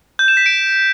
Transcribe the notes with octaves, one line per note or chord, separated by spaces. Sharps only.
G6
E7
B6
D7